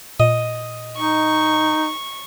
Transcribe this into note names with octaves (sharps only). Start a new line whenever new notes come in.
A#2 D#5
D#4 C#6